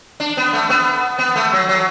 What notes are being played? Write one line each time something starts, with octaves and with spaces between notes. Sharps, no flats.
D4
B3
A3
B3
B3
A3
F#3
F#3